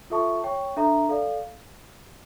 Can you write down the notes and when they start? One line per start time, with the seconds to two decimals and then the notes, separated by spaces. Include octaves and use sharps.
0.10 F4 A4 E5 A5 C#6
0.44 C#5 G5 C#6
0.77 D4 A4 E5 A#5
1.09 A4 D5 F5